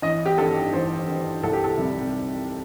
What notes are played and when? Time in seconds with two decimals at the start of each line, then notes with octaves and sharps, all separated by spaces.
0.02 A1 D#5
0.26 G4
0.38 G2 D#3 A4
0.73 A1 C5
1.07 G2 D#3
1.43 C2 A4
1.53 G4
1.64 A4
1.78 C3 D#3 G3